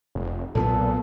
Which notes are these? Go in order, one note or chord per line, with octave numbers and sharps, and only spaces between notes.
F1
B1 A#2 E3 B3 A4